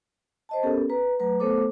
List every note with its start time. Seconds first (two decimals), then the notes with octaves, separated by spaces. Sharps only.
0.49 C5 D#5 A5
0.63 B3 C#4 G4 A4 A#4
0.90 B4 A#5
1.19 F#3 A3 B4 A#5
1.40 A3 B3 A4 C5 D6